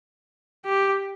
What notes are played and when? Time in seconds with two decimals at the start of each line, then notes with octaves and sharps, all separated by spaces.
0.66 G4